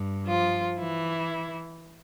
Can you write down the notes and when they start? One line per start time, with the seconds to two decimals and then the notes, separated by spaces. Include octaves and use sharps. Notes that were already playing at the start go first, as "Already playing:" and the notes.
Already playing: G2
0.27 F3 F4
0.79 E3 E4